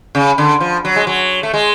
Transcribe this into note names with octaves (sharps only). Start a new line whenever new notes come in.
C#3
D3
F3
F#3
G#3
F#3
A3
G#3